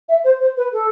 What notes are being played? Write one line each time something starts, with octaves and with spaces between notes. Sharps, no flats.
E5
C5
C5
B4
A4